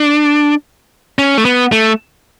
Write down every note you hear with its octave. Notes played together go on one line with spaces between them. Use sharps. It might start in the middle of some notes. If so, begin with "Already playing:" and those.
Already playing: D4
C#4
A3
B3
A3